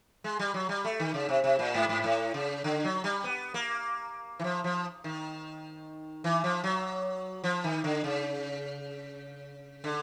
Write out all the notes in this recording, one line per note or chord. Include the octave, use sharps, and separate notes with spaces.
G#3
G3
F#3
G3
A3
D#3
C#3
C3
C3
A#2
G#2
G#2
A2
C#3
D3
F#3
G3
B3
A#3
E3
F3
F3
D#3
E3
F3
F#3
F3
D#3
D3
C#3
D3